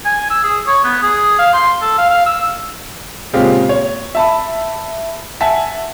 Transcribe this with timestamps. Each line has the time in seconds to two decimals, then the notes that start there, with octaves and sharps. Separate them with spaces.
0.05 G#5
0.30 E6
0.43 G#4
0.67 C#5
0.84 B3
1.03 G#4
1.39 F5
1.53 C6
1.81 A4
1.98 F5
2.10 F5
2.26 E6
3.33 A#2 C#3 G#3 C4 F4 G4
3.69 C#5
4.15 E5 A5 B5
5.41 E5 F#5 G#5 A5 B6